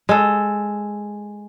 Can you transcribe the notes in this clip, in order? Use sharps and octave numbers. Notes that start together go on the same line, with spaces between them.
G#3 A4